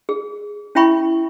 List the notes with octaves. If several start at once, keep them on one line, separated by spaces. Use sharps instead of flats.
G#4
C#4 E4 E5 G5 B5 C#6